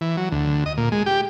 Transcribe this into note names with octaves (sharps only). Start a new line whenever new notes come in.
E3
F#3
D2
D#5
A#2
G#3
G4